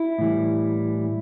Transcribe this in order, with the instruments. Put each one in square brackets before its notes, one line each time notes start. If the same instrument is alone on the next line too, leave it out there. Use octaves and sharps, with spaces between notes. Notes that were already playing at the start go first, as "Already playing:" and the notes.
Already playing: [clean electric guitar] E4
A2 E3 G3